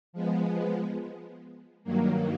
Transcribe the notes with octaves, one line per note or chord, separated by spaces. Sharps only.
F3 G#3 B3
G2 D#3 F#3 A#3